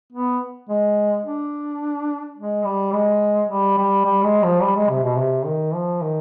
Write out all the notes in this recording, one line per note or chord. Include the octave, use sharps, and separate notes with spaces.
B3
G#3
D4
G#3
G3
G#3
G3
G3
G3
G#3
F3
G3
G#3
C3
B2
C3
D#3
F3
D#3